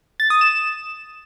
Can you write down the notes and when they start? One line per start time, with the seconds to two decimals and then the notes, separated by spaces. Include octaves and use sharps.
0.20 A6
0.30 D#6
0.41 E7